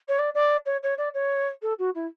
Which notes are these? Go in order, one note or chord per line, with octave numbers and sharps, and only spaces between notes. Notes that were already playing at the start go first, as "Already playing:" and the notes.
C#5
D5
D5
C#5
C#5
D5
C#5
A4
F#4
E4